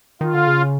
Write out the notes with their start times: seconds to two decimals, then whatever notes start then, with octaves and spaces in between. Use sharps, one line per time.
0.21 D#3 F4
0.34 D3
0.47 C#3